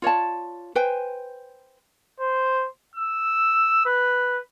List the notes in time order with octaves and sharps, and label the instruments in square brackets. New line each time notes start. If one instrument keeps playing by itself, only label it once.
[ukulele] F4 C#5 D5 A5
B4 C5 G5 G#5
[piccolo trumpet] C5
E6
B4